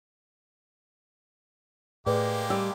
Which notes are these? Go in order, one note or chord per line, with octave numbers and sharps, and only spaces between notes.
A2 G#3 A#3 G4 G#4 B4 D5
G3 G5 E6